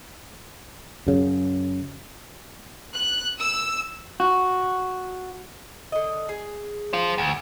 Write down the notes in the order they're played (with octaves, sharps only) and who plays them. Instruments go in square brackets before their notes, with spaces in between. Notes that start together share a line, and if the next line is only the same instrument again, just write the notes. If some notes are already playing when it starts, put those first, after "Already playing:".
[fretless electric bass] F#2 C#3 F#3
[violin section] F#6
E6
[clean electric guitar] F#4
[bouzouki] D3 D#5
G#4
[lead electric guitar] C5 F5
D2